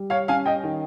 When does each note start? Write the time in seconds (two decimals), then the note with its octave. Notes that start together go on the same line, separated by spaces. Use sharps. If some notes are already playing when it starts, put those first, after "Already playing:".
Already playing: G3
0.10 C#5 F5
0.28 C#4 F5 G#5
0.46 D#5 G5
0.63 D#3